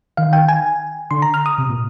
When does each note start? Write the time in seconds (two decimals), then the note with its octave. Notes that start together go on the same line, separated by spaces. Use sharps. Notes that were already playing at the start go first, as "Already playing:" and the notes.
0.17 D#3 F5
0.33 G5
0.48 G#5
1.11 D3 C6
1.22 A#5
1.34 F6
1.46 D#6
1.58 C3
1.69 A#2